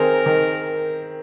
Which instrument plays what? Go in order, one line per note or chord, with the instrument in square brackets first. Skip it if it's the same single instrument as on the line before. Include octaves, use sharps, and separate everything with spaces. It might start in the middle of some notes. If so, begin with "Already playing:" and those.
Already playing: [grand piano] D#3 C4 G#4 [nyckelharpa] A#4
[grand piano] D#3